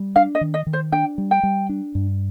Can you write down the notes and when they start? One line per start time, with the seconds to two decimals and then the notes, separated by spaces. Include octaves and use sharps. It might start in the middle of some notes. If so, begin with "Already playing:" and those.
Already playing: G3
0.16 D4 F5
0.35 D#5
0.41 D#3
0.54 D#5
0.67 D#3
0.73 C5
0.92 D4 G5
1.18 G3
1.31 G5
1.43 G3
1.69 D4
1.95 G2